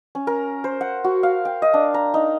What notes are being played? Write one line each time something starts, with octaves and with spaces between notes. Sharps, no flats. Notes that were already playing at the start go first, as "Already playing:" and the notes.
C#4
A#4
C5
F#5
F#4
F5
G5
D#5
D4
A#5
D#4